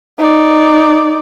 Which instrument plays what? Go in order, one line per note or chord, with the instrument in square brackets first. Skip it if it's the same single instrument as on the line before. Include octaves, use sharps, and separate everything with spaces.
[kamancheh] D#4 D5